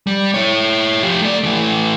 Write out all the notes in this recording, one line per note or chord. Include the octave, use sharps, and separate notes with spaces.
G3
E4 C#5
F3 G4
A3 D5
E3 A3